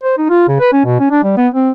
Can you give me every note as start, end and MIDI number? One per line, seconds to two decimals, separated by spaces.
0.03 0.16 72
0.18 0.27 63
0.29 0.47 65
0.48 0.56 49
0.60 0.72 71
0.72 0.82 61
0.85 1.00 47
1.00 1.08 61
1.11 1.22 62
1.24 1.34 55
1.37 1.48 59
1.54 1.70 60